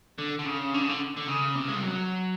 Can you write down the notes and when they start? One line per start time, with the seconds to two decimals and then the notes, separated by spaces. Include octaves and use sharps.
0.18 D3
0.39 D3
0.45 C#3
0.74 D3
0.81 C#3
0.89 D3
1.17 D3
1.28 C#3
1.56 C3
1.68 G#3
1.75 G3
1.83 F#3